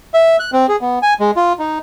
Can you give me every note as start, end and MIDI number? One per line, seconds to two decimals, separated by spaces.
0.14 0.37 76
0.40 0.51 90
0.53 0.67 60
0.69 0.76 68
0.81 0.99 59
1.02 1.14 80
1.20 1.31 56
1.36 1.53 65
1.59 1.79 63